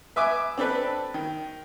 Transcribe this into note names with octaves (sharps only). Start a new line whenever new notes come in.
B4 E5 G#5 D6
C4 D4 A4 B4
D#3